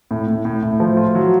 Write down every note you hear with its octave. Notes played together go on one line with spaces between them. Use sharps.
A2
A2
A2
A2
F3
F4
F#3